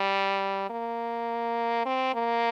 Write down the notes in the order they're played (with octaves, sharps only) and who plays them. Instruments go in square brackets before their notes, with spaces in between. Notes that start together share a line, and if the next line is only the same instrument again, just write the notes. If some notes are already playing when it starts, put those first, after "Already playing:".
Already playing: [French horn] G3
A#3
C4
A#3